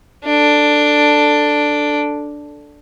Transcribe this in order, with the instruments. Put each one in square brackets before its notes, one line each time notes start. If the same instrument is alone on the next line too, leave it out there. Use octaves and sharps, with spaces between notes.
[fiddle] D4 A4